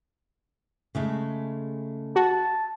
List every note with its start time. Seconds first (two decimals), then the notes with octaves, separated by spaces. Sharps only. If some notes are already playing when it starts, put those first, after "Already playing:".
0.95 C#3 G#3 A3
2.16 F#4 A5